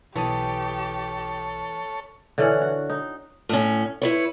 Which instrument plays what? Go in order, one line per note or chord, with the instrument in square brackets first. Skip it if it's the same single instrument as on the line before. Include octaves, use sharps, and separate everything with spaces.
[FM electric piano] B1 A5 D#6 [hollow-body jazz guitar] E3 [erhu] G4 [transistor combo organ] A4 C#5
[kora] D3 E3 C#4 F#5
F#4
D#4
[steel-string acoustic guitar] A2 C#4
E4 B4 C#5